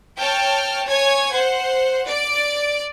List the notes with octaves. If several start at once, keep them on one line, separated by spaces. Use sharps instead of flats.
C#5 G5 A5 F6
C#5 G#5 G#6
C5 F#5
D5 D7